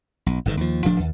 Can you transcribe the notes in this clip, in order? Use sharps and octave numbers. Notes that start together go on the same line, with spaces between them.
B1
G1 G#2 C3 D#3
D#2 F3
D1 D2 F3 D4
D#2